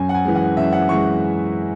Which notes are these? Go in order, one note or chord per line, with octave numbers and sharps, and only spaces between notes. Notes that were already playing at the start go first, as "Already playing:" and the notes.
Already playing: F#2 G#5
F#5
G#5
E3 G#3
F#5
F#2 E5
F#5
E3 G#3 C#6